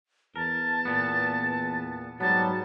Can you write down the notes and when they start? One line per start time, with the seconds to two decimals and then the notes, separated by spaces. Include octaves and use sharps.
0.36 E2 A#4 A5
0.85 A#2 B3
2.20 G#2 F#3 G3 B3 A5